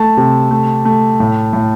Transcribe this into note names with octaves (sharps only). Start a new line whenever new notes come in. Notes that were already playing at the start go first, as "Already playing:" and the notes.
Already playing: A3 A5
C3
A3
A3
A2
A2